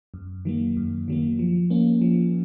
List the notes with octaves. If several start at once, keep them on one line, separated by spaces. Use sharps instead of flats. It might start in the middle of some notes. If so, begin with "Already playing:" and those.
F#2
D#3 F#3 A#3
F#2
D#3 F#3 A#3
F3
A#3 C#4
F3